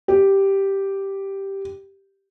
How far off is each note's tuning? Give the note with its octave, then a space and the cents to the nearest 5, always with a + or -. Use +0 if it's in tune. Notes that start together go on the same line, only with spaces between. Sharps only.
G4 -5